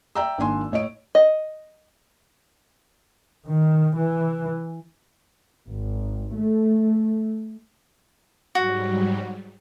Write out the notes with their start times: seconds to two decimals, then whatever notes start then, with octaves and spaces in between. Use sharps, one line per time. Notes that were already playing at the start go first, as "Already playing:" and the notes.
0.15 D5 E5 G5 A#5 E6
0.38 G#1 A#3 D4 G#5 C6
0.72 A2 C#5 D#5 D7
1.15 D#5
3.46 D#3
3.97 E3
5.69 G#1
6.36 A3
8.55 G#2 F#3 G3 F#4